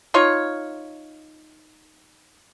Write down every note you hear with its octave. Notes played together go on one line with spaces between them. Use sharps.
D#4 F4 C#5